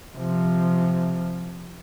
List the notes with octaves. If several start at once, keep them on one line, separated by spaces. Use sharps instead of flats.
C3 F3